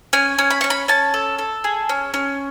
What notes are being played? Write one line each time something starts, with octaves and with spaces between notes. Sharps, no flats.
C#4 G#5
C#4
B5
C#4 C#6
B5
C#4 A5
A4
A4
G#4
C#4
C#4